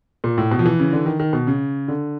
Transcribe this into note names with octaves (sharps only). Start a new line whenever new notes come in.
A#2
A2
B2
F3
E3
C#3
D3
D#3
D#3
B2
C#3
D3